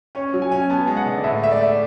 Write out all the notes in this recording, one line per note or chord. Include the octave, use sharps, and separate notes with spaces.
C#4 C#5
F#3
G#5
C#4
B3 A5
G#3
F#5
D3
D5
A2 E5
A3 E5
D5
A3